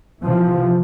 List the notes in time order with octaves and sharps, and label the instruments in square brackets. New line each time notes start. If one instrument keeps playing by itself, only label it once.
[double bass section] C3 E3 F3